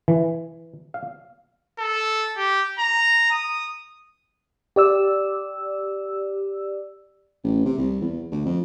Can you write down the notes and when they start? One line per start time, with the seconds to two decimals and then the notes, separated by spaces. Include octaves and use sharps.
0.08 E3
0.94 F5
1.79 A4
2.37 G4
2.79 A#5
3.31 D#6
4.76 G4 D5 E6
7.44 A1
7.65 C3
7.78 C2
8.01 E2
8.31 D2
8.46 F2